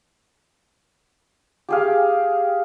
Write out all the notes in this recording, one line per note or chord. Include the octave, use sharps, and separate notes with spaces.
G4 G#4 F5